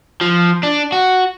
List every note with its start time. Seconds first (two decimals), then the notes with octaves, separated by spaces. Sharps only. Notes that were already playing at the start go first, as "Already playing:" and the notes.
0.21 F3
0.63 D4
0.92 F#4